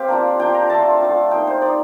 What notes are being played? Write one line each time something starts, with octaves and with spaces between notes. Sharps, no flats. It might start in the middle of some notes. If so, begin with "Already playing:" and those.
Already playing: C4 G4 F5
A#3 D4 F4
A#3 D4 F4 G5
A#5
A3 D4 F4 A5
A3 D4 F4
A#3 D#4 G5
C5
A#3 D#4 D5